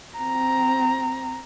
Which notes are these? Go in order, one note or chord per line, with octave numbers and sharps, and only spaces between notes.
C4 A#5